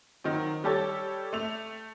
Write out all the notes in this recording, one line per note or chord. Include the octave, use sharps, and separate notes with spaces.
D#3 F#3 C4
G3 G4 A4 C#5 A6
A3 F7